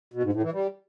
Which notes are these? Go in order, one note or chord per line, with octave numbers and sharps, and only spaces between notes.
B2
G#2
A2
E3
G3